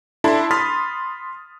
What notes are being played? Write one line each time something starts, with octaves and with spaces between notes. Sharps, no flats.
D4 E4 A4 A5 B5 C6
B5 C6 D#6 F6 A6 B6